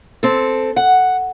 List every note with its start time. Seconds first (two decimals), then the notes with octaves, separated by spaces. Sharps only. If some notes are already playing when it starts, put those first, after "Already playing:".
0.23 C4 A4
0.76 F#5